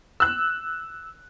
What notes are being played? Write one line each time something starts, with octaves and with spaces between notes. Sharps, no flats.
E6 F#6